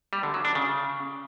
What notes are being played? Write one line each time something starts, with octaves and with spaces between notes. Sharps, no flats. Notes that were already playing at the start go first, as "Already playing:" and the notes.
G3
D3
F#3
D4
C#3